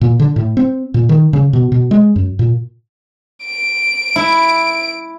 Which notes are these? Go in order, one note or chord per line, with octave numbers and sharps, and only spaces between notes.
A#2
D3
A2
C4
A#2
D#3
C#3
B2
B2
G#3
F#2
A#2
D7
E4